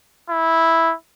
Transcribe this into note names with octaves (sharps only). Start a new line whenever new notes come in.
E4